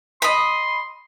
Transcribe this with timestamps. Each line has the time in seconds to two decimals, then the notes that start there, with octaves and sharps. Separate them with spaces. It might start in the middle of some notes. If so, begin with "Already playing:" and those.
0.22 D#5 B5 C6